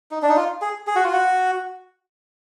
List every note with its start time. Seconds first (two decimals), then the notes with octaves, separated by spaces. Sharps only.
0.11 D#4
0.22 D4
0.29 D#4
0.36 F4
0.62 G#4
0.87 G#4
0.96 F#4
1.04 F4
1.13 F#4